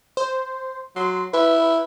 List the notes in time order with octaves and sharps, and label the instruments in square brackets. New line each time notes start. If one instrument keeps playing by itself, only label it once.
[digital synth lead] C5
[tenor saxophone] F#3 [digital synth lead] C6
[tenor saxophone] E4 [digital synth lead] B4